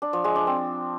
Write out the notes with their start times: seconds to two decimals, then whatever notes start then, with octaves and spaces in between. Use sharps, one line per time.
0.02 D4
0.13 F3
0.24 G#3
0.36 D4
0.47 C4